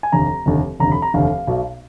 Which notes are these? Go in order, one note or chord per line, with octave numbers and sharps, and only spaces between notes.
G#5
F1 D#2 D3 A#5
F1 D#2 D3
F1 D#2 D3 A#5
B5
A#5
F1 D#2 D3 F5
B1 B2